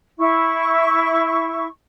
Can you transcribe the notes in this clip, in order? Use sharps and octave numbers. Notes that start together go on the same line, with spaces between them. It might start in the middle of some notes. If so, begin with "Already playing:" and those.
E4 C#6